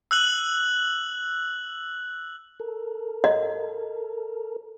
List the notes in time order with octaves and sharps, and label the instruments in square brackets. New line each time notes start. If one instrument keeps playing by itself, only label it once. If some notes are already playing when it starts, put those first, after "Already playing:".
[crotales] E6 F#6 F#7
[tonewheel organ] A4 A#4
[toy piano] D#5